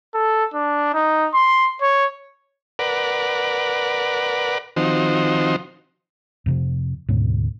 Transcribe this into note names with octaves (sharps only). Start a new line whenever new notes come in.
A4
D4
D#4
C6
C#5
A#4 B4 D5 F#5
D#3 F3 C4 D#4 F#4 C5
F2 C3 F3
D2 G#2 B2 C#4